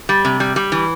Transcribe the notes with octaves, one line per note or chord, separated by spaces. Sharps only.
G3
C3
G3
G3
E3